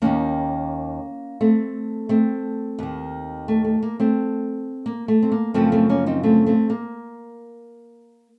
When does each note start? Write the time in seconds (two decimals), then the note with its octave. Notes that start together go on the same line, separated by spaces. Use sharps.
0.02 D#2 D#3 A#3 C#4
1.41 A3 C4
2.09 A3 C4
2.79 D#2 D#3
3.48 A3
3.65 A3
3.83 A#3
4.00 A3 C4
4.86 A#3
5.08 A3
5.23 C4
5.32 A#3
5.54 F#2 C#3 F3 A3 C4
5.72 A3 C4
5.89 A#3 C#4
6.06 C4 D#4
6.23 A3 C4
6.46 A3 C4
6.70 A#3